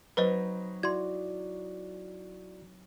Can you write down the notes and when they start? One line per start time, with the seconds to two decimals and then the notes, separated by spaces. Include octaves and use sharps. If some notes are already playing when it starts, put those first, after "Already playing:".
0.17 F#3 C4 D#4 B4 C5 D#5 B5
0.83 E4 F#4 D5 C6 G#6